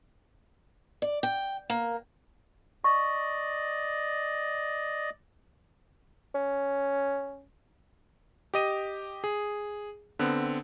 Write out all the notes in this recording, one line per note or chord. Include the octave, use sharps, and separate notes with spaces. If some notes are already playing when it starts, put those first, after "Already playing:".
D5
G5
A#3
D5 D#5 C#6
C#4
G4 D#5 D#7
G#4
D3 B3 C4